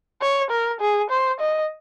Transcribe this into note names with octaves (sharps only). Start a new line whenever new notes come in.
C#5
A#4
G#4
C5
D#5